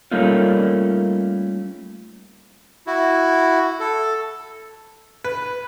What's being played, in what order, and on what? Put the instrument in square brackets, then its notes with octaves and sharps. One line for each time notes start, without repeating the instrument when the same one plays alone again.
[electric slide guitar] G3 A3 A#3 C#4 D#4 F4
[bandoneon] E4 F#4
A4
[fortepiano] B4